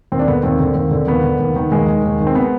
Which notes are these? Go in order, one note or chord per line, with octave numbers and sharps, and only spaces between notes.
D#2 C4
D4
D3 B3
D#2 C4
D3
D#2
D3
D#2 B3
D3
D#2
D#3
D#2 G#3
D#3
D#2
D#3
C4
B3